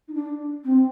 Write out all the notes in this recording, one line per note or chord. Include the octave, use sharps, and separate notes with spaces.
D#4
D4
C4